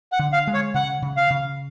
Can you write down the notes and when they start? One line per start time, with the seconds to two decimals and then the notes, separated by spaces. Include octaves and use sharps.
0.12 F#5
0.19 D3
0.33 F5
0.47 G#3
0.54 C#5
0.74 C#3 F#5
1.02 C#3
1.17 F5
1.30 C#3